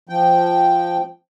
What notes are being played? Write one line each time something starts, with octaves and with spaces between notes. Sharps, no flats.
F3 G5